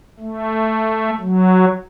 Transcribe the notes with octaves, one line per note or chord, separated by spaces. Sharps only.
A3
F#3